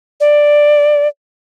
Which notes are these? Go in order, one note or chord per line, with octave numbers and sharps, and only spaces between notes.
D5